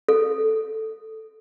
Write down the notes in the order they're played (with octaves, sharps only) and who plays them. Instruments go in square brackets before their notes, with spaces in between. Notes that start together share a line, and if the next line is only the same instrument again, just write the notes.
[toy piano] A4